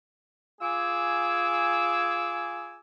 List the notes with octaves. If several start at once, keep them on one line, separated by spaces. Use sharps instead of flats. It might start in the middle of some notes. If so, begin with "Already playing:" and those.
F4 G#4 G#5 D6 E6